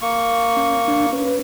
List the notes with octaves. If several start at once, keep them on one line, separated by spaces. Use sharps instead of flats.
A#3 C#6
C#4
D4
C#4 B4